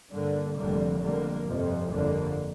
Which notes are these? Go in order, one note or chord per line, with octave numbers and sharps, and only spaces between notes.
G2 D3 A#3
F1 F2 D3 G3 A#3
F2 D3 G3 A#3
G1 F2 C3 F3
G1 F2 D3 A#3